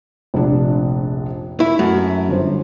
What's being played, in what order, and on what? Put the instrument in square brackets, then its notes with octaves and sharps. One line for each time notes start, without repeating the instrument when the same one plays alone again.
[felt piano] F1 A#1 D4
[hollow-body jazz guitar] E4
[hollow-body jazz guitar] F#2 [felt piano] A3
[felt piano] G1 C5